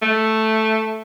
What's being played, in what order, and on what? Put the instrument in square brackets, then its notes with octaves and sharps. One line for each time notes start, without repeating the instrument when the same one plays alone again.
[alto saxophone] A3